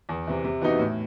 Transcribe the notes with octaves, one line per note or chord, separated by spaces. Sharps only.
E2
C3 E3
C3
E3 B3 D#4 F#4
A2